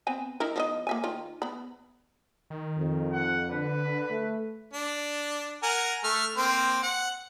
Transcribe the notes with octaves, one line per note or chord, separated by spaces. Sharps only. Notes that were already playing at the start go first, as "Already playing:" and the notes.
B3 C4 G#5
D#4 E4 A#4
F3 B3 D#5
A#3 E5 G#5
D#3 F4
B3 B5
D#3
F2
F#5
D3 B4
A3
D4
A#4 F#5 G#5
A3 F6
A#3 C4 C5
F#5